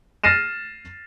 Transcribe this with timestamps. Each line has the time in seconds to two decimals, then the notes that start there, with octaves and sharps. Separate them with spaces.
0.24 F6 A6 A#6 C7 D#7 E7